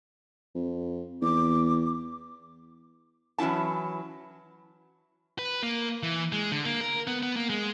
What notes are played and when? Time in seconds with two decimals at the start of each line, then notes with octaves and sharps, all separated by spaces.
0.55 F2
1.22 E2 D6
3.38 E3 F#3 C#4 E4 A5
5.39 B4
5.63 A#3
6.03 E3
6.32 G#3
6.52 D3
6.65 A#3
6.81 A#4
7.07 B3
7.23 B3
7.36 A#3
7.50 G#3